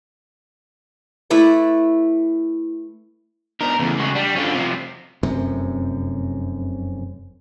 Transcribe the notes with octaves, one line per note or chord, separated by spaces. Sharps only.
A3 E4 B4 D5
B3 D4 D#4 A#4
E2 C#3 A3
G#3 F#4
G3 D4
D3 F#3 C4 C#4 F4
C3 F3
F1 F#2 C3